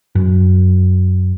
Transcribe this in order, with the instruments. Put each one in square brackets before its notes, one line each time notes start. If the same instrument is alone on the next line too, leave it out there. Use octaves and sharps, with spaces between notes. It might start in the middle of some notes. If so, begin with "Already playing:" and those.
[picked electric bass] F#2